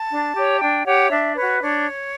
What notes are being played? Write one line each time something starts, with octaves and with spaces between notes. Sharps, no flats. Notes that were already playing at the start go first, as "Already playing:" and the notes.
Already playing: A5
D4
G4 C#5
D4 G5
G4 C#5 F#5
D4 E5
B4 C#5
F#4
D4 C#5